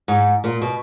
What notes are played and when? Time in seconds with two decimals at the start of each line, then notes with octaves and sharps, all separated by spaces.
0.08 G#2
0.44 A#2
0.61 B2